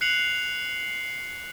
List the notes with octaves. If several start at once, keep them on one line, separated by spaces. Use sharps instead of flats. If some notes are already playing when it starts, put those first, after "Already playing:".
F#6 C7 C#7 F7 F#7